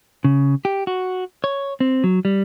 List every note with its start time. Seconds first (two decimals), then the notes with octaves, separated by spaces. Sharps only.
0.24 C#3
0.65 G4
0.87 F#4
1.44 C#5
1.80 C4
2.04 F#3
2.25 G3